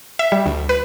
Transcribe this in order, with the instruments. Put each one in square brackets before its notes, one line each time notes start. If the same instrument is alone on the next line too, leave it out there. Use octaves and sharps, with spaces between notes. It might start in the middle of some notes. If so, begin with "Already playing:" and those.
[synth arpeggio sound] E5
G3
D2
B4